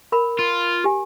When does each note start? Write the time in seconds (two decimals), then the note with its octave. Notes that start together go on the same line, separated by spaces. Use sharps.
0.12 A#4 B5
0.39 F4
0.84 G4 G#5